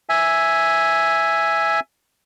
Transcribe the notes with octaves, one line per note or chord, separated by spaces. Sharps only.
E5 G#5